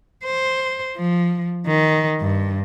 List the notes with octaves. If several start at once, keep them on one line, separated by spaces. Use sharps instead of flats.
C5
F3
D#3
G2